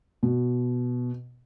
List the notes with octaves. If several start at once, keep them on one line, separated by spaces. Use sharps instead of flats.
B2